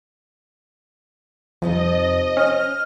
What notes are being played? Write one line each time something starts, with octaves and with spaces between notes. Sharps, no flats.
F2 C3 F3 D#4 D#5
C#4 F6